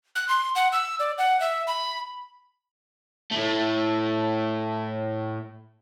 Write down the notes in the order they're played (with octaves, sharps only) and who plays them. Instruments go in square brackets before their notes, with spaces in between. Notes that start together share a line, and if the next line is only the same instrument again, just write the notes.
[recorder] F#6
C6
F#5
E6
D5
F#5
E5
B5
[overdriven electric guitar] A2 A3